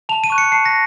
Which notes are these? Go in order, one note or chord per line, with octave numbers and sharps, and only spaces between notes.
A5 F7
D#7
C#6 F#6
C#7
A5 C7
A#6